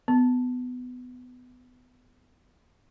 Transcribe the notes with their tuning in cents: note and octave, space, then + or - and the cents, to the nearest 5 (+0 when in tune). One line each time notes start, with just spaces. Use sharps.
B3 +20